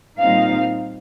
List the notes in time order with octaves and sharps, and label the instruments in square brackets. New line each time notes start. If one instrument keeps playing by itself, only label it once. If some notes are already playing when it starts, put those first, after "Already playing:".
[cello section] A#2 G3 C4 D#4 F5